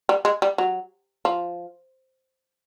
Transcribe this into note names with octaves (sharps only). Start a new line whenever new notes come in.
G3
G#3
G3
F#3
F3